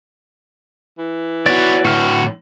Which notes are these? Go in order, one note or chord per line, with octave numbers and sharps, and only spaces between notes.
E3
B3 F#4 C#5 D5
A2 D3 F#4 F6